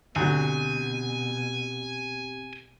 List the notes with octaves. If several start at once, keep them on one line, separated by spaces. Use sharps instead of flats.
D2 B2 F#3 C4 G4 G#5